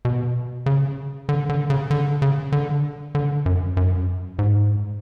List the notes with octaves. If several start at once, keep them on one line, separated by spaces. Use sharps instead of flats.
B2
C#3
D3
D3
C#3
D3
C#3
D3
D3
F#2
F#2
G#2